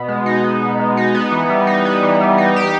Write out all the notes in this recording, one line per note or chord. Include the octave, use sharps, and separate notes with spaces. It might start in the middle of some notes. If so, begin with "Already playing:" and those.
Already playing: B2 B3
G#3
D#4
B3
B2
G#3
D#4
B3
E3
G3
D#4
B3
E3
G3
D#4
G4